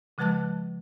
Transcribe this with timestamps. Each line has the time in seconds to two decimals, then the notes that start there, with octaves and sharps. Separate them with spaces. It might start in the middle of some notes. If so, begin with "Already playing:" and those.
0.18 C#3 F3 G#3 B4 A5 F#6